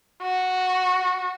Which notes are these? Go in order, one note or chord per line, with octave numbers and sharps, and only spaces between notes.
F#4